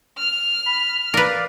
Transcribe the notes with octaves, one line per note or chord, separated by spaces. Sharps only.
F6
B5
A#4 B4 D5 F5